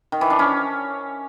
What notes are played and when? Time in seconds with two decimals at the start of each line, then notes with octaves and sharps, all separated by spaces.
0.12 D#3
0.21 E3
0.30 D4
0.39 C#4